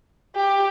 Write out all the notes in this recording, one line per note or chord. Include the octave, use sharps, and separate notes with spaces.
G4